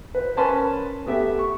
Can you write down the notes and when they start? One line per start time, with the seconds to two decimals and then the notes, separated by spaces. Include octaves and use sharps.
0.15 B4 C5
0.37 C#4 A#4 B4 A5 B5 C6
1.06 A3 B3 G4 E5
1.39 C#6